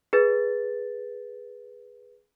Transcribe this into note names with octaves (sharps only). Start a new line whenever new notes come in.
G#4 B4 A6